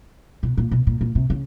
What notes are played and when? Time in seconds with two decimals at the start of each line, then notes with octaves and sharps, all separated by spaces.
0.43 B2
0.57 A#2
0.71 B2
0.87 A#2
1.01 A#2
1.15 C3
1.30 C#3